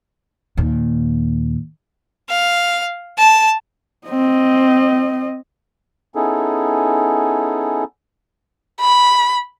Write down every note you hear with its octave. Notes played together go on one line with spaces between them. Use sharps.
D#2 A#2
F5
A5
C4 D#5
B3 C#4 D#4 E4 G#4 A4
B5